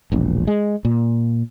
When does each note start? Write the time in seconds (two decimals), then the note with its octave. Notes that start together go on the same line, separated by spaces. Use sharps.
0.12 E1 A#1
0.47 G#3
0.85 A#2